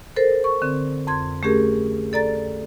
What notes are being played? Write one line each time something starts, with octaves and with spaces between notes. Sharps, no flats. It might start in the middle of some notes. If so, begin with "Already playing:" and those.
A4 A#4 C5
C#6
D3 C4
F2 C6 G#6
A3 C#4 G4 G#4 A#4
A4 D5 A#5 A6